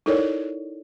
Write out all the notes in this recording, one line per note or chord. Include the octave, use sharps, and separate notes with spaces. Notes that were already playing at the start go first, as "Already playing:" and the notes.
D#4 E4 A4 A#4 C#5 D5